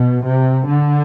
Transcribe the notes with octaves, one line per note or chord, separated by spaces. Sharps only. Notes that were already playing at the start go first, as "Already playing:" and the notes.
Already playing: B2
C3
D3